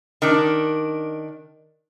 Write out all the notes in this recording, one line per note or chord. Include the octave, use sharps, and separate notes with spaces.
D#3 D4